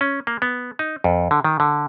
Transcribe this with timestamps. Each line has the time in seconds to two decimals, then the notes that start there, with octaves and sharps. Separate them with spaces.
0.01 C#4
0.27 A#3
0.42 B3
0.79 D#4
1.04 F2
1.31 D3
1.44 D#3
1.60 D3